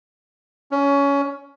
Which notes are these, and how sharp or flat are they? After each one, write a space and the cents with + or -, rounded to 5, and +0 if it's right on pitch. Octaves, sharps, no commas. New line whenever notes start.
C#4 +20